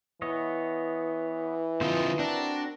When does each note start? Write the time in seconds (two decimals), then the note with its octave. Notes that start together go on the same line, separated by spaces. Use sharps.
0.22 E3 B3 C#5 D#5
1.81 D3 C4 F4 C5 D#5
2.19 C4 D4 F#4 A#4